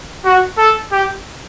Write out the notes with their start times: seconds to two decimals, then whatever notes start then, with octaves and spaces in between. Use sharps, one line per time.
0.26 F#4
0.58 A4
0.92 G4